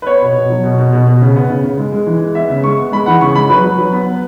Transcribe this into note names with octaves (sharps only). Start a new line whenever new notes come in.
B4
B3 C#5
B2
B2
F#3
B2
B2
B2
B2
C#3
B3
C#3
C#3
G#3
G#3
E3
G#3
B3 E5
C#3
G#3 C#6
B3
G#3 B5
E3 F#5
C#3 C#6
G#3 B5
F#3 B4
F#3
F#3
B3
B3